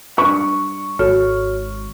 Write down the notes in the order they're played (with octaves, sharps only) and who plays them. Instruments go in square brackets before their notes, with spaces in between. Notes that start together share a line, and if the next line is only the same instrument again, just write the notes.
[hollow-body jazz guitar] G2 D4 B5 [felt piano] C#6
[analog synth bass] G#1 [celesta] F#4 C#5 F6 [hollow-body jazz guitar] A4